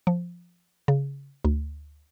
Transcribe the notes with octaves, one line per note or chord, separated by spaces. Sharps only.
F3
C#3
D2